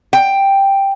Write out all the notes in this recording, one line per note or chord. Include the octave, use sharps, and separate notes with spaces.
G5